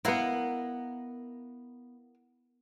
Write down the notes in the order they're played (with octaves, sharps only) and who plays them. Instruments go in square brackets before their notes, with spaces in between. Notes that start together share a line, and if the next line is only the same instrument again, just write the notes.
[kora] B3 E4 [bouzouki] A#4 F5 F#5